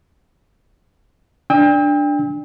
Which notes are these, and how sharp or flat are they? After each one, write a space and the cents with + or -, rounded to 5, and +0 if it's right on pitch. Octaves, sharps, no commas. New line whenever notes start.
D4 +0 G5 +35 E6 -35